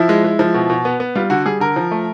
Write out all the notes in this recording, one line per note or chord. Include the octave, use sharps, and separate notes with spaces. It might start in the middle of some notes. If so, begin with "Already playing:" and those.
Already playing: F3 E4
G#3
G#3
F3
B2
B2
B3
B3
G3 F4
D3 F#4
G3 G#4
D3 A#4
F3
A3